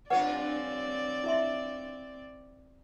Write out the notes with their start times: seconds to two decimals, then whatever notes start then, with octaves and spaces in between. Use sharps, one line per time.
0.10 G2 C4 F4 B4 C#5 D5 F#5
1.24 E4 E5 C6